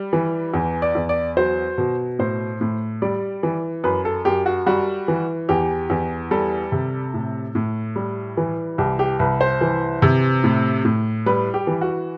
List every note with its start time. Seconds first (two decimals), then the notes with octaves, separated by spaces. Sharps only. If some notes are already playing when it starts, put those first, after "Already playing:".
Already playing: G3
0.13 E3
0.54 E2
0.82 D5
0.95 E2
1.09 D5
1.37 F#3 C5
1.78 B2
2.19 A2 C5
2.61 A2
3.02 G3 D5
3.43 E3
3.84 F#2 B4
4.05 A4
4.25 F#2 G4
4.46 F#4
4.66 G3 F#4
5.08 E3
5.49 E2 G4
5.90 E2
6.31 G3 A4
6.72 C3
7.14 A2
7.55 A2
7.96 G3
8.37 E3
8.78 C2 G4
8.99 G4
9.19 C2 B4
9.41 C5
9.61 E3
10.02 C3
10.44 A2
10.85 A2
11.26 G3 B4
11.54 G4
11.67 E3
11.81 F#4